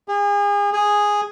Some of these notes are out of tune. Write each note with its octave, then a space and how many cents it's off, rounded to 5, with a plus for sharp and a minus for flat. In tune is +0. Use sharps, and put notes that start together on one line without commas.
G#4 -35
G#4 -5